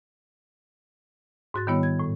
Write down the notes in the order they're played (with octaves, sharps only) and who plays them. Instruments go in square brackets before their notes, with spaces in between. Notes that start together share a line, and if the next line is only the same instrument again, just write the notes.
[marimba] G#2 F#4 A6
D#3 G3 B3 E4 C#5
G#6
A2